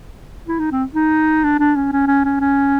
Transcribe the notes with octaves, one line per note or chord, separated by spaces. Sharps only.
E4
D#4
C4
D#4
D4
D4
C#4
C#4
C#4
C#4
C#4